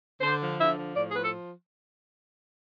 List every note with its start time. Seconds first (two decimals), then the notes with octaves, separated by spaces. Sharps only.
0.20 D3 C5
0.40 F3
0.59 D3 E5
0.77 F3
0.96 A2 D5
1.09 G#4
1.15 F3 B4
1.22 A4